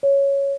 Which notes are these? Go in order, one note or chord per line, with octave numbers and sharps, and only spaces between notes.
C#5